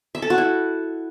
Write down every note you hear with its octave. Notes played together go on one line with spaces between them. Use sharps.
E5
A4
F#4
E4